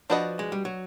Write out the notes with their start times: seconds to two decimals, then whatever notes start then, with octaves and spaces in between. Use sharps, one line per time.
0.10 F3 D4 F#4 B4 D#5
0.39 G#3
0.52 G3
0.65 F#3